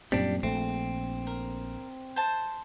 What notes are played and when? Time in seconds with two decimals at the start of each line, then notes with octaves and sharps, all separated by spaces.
0.12 F#2 A#2 G3 C4 D4
0.43 A#1 A3 C4
1.27 A#4
2.16 C5 A5